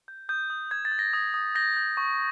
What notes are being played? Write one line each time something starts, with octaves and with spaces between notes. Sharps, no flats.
G6
D#6 G6
D#6
G6 G#6
A6
G6
A#6
D#6
D#6
G6 A#6
G6
C#6